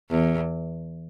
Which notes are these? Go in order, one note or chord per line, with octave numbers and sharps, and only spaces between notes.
E2